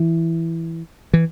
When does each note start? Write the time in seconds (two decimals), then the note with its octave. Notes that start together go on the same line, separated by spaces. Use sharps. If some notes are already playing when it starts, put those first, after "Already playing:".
Already playing: E3
1.14 E3